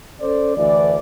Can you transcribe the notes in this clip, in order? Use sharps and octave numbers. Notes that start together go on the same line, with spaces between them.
C#4 A4 C5 D5
D2 E3 D5